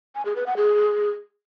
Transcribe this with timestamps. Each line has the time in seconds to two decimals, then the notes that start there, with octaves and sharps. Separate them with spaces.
0.15 G#5
0.25 G#4
0.36 B4
0.46 F#5
0.57 G#4